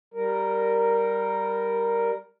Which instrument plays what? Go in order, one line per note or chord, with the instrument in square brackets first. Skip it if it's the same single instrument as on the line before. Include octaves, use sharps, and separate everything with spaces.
[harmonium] G3 A#4